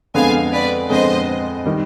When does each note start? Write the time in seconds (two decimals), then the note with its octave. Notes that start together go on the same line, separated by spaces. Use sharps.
0.14 F2 D3 G#3 B3 F5 G#5
0.52 B4 D5
0.90 F2 D3 G#3 B3 C5 D#5
1.65 D#3 G3